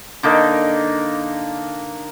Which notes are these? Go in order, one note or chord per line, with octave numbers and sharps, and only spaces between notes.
D3 A#3 D#4